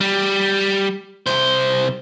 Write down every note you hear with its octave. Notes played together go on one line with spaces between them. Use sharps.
G3
C2 C5